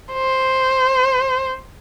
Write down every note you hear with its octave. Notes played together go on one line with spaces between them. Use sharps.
C5